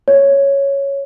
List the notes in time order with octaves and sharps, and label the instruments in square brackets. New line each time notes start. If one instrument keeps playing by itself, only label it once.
[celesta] C#5